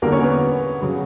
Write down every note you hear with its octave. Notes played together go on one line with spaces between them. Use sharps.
E2 D3 G3 A#3 A#4
C#4 C#5
B3 B4
C#3 F#3